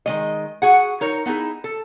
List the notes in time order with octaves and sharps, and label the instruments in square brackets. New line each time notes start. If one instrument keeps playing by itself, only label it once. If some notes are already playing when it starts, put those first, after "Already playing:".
[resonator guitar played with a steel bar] D#3 G#3 D#5
F#4 G#4 F#5
D#4 A#4 C#5
B3 D#4 E4 G#4
A4